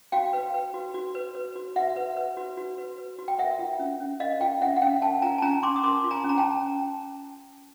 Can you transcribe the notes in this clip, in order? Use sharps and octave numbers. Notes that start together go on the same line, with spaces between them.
F#4 F5 G5
B4
B4
F#4
F#4
B4
B4
F#4
F#4 E5 F#5
B4
B4
F#4
F#4
B4
B4
F#4
G5
A#4 E5 F#5
F4
C#4
C#4
A#4 D#5 F5
F4 F5 G5
C#4 E5 F#5
F#5
C#4 F5 G5
A#4 G5 A5
F4 G#5 A#5
A5
C#4 G#5 A#5
C#4 C6 D6
D#6
A#4 C6 D6
F4
G#5 A#5
C#4 A#5
G5 A5